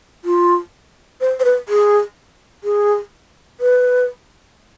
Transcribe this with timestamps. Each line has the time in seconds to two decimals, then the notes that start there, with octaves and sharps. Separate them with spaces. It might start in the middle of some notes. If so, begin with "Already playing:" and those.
0.25 F4
1.21 C5
1.40 C5
1.45 B4
1.69 G#4
2.64 G#4
3.60 B4